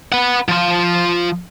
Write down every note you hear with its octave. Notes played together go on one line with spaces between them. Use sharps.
B4 F#5
F3 F4